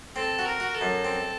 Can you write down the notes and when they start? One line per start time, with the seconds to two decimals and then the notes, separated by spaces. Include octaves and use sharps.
0.16 C4 A4
0.39 F#4
0.46 A#4
0.60 F#4
0.74 A4
0.81 F#2
1.05 C4